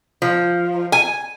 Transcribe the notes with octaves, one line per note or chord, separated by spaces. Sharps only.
F3
G#5